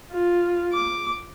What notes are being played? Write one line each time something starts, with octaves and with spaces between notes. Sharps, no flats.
F4
D6